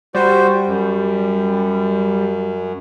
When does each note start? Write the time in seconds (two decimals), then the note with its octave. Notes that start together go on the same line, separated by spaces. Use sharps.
0.15 G3 F#4 C5
0.67 F#2